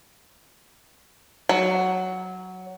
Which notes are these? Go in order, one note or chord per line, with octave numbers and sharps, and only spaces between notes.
F#3